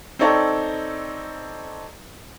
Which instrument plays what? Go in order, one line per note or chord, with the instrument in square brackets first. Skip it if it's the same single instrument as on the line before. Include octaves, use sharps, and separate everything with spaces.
[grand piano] C4 D#4 A4 C#5 D5